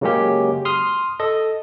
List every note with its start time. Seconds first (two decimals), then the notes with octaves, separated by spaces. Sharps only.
0.01 C#3 F#3 G#3 A#3 C#4 G4
0.65 C6 D#6 F6
1.20 A4 D#5